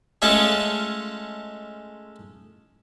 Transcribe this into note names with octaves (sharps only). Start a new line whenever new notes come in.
G#3 A3 C#4 F4 A4